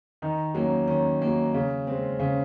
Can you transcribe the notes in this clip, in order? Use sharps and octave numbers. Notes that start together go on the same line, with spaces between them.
D#3 D#4
F#3 A#3 C#4
D#3 C#4
F#3 A#3
C#3
G#3 C4
C#3 C#4